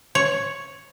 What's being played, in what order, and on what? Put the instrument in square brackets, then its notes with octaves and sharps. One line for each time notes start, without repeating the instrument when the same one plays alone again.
[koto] C#5